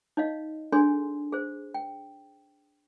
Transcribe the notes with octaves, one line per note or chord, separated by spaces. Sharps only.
D#4 C#5 D#5 F5
D4 G#4 A4 C#5 G#5 C6
G#4 C5
G5